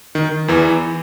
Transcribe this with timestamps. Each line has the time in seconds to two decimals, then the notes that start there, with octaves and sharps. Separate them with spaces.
0.15 D#3
0.48 E2 E3